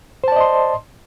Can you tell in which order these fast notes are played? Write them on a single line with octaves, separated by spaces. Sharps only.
C5 A5 D5 D#5 C6